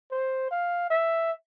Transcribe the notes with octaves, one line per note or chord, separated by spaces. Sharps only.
C5
F5
E5